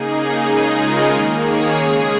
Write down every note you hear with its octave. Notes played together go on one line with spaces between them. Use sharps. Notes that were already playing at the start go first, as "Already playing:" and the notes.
Already playing: C#3 A#3 D#4 G#4
C#3 G#3 D#4 G#4
F4 A#4
D#3 A#3
G#4 C#5
C#3 G#3 G#4 C#5